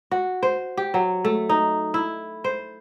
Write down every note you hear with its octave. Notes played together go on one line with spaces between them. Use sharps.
F#4
C5
G4
F#3
A3
D#4
E4
C5